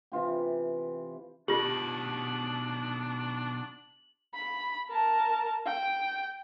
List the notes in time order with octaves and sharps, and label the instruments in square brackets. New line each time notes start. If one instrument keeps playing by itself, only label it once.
[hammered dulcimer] C3 E3 F4 G4
[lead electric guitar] B2 D#3 [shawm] D4 [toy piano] F4 G4 [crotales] F#7
[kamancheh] B5
A#4 A5
G5